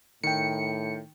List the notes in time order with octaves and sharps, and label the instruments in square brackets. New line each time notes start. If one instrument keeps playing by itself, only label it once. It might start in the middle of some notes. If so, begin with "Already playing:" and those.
[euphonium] A2 [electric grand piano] D#3 G5 [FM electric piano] C#7